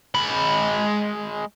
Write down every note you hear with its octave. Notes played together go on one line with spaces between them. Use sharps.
G#3 B5